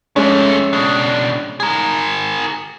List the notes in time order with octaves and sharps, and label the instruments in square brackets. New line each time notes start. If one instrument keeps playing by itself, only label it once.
[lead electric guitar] F2 A3 [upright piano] G#3 C#4
[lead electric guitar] B2 D4
G#4 A#4